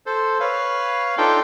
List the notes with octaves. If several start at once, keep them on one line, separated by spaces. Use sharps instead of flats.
A4 C5
B4 C#5 F5
D4 D#4 F4 A4 G5 C6